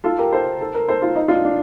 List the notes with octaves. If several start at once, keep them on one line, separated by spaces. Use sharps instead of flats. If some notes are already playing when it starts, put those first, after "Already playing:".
F4 A4
G4 A#4
A4 C5
A4
A#4
A4 C5
F4
D#4
D4 F4
D4